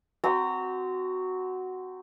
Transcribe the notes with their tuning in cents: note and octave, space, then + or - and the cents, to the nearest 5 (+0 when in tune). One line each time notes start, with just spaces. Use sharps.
C4 -15 F#4 +5 A#5 -25